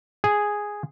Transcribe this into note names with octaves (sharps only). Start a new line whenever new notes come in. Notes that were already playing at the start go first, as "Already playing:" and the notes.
G#4